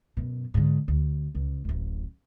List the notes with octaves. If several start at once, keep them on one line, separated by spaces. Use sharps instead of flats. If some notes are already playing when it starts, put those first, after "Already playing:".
F#2 B2
G#2 D3
D2
C#2
D1 A1